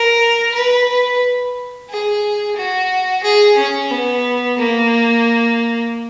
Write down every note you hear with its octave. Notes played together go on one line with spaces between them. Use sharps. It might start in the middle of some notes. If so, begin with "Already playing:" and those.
Already playing: A#4
B4
B4
G#4
F#4
G#4
C#4
B3
A#3